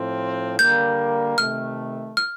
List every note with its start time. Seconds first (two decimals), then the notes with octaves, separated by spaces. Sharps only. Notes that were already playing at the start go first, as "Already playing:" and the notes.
Already playing: A2 F3 C4
0.58 D3 G3 A#3 G6
1.38 C3 D#3 A3 F6
2.17 F6